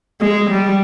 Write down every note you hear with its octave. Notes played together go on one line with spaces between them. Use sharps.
G#3
G3